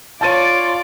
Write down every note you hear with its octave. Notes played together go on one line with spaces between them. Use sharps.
F4 C#5 D5 A5 D6 A6 D#7